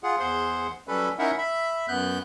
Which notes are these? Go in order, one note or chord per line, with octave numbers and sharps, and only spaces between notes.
F4 G#4 F#5
E2 G#4 C5 F#5 C6
F#3 G3 C#4 A4 B4 B5
C#4 D#4 E4 A#4 E5 F#5
E5 B5
F#2 B3 F#6 G6